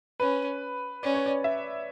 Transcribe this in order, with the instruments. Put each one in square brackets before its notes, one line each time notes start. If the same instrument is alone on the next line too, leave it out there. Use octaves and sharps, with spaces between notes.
[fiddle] C#4 [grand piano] B4
[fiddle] C#4 [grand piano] D5
[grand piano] C#5
D5
E5